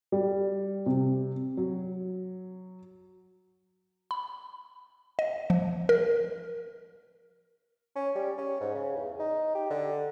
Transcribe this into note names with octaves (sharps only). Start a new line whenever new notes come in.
G3
C3
F#3
B5
D#5
F3
A#4
C#4
G3
C#4
G#2
C#3
E2
D#4
G4
D3